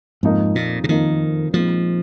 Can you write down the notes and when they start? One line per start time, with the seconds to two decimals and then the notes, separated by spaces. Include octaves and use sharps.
0.23 F2 G#2 F3 A#3 D#4
0.55 A#2
0.84 C3
0.89 F2 D#3 F3 A#3 D#4
1.54 A#2 F3 G#3 C4 D#4